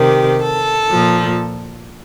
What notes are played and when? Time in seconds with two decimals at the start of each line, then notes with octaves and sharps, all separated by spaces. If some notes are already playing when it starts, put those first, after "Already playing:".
Already playing: C3 D#3 G4
0.43 A4
0.92 A#2 F3